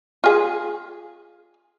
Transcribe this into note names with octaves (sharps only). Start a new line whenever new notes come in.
F4 G#4